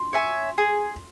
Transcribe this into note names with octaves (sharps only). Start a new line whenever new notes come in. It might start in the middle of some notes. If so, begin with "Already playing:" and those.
Already playing: C6
C#5 E5 G#5
G#4